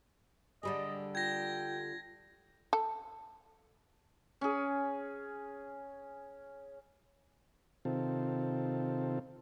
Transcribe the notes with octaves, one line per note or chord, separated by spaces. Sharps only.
D3 G3 G#4 D#5
F4 G5 G#6 A#6
A4
C#4 G#4
C3 D#3 C4 F4 A4